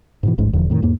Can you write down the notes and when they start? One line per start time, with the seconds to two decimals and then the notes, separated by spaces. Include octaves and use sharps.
0.23 G#2 B2 E3
0.38 D1 A1 G#2 G#3
0.53 E1 E2 D3 F3
0.70 F2 A2 D#3
0.82 E2 G#2 A#3